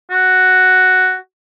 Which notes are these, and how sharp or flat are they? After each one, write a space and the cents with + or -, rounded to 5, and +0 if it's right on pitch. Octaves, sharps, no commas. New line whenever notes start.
F#4 +5